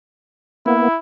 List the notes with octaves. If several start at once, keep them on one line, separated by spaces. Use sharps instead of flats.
A#3 B3 E4